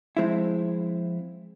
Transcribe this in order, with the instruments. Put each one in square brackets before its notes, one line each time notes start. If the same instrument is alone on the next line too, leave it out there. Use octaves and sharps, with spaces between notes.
[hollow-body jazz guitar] F3 G#3 C4 E4